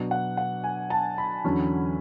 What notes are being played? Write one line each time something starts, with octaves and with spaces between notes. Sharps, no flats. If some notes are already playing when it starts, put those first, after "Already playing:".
Already playing: B2 F#3 B3 D4
F#5
F#5
G#5
A5
B5
E2 D3 F#3 C#4